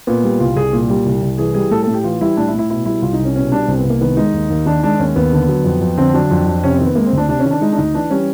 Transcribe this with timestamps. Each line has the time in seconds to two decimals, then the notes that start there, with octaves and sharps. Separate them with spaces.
0.07 A#2 B3
0.24 G3
0.40 C2 F4
0.56 C2 G#4
0.73 A#2
0.90 G3
1.06 C2
1.22 C2
1.38 E3 G#4
1.54 G3 G#4
1.71 A2 A4
1.83 A2 A4
1.94 G4
2.04 E3 F4
2.21 G3 E4
2.37 A2 D4
2.48 E4
2.53 A2
2.59 E4
2.70 B2 E4
2.86 G3 E4
3.02 C2 F4
3.13 D#4
3.19 C2
3.25 C#4
3.36 B2 C#4
3.52 G3 D4
3.68 C2 C4
3.79 B3
3.85 C2
3.90 A#3
4.01 D#3 B3
4.17 G#3 D#4
4.34 D#2
4.50 D#2
4.66 D#3 D4
4.83 G#3 D4
4.99 D#2 C#4
5.16 D#2 B3
5.32 D3
5.49 F#3
5.64 F2
5.81 F2
5.98 D3 C4
6.14 F#3 D4
6.31 F2
6.47 F2
6.63 C3 C#4
6.74 C4
6.80 D#3 B3
6.95 G#3 A#3
7.06 C4
7.13 D2 D4
7.29 C3 D4
7.40 D#3 C#4
7.51 D4
7.61 G#3 D#4
7.72 D4
7.78 D2 D#4
7.94 E3 D4
8.10 G3 C#4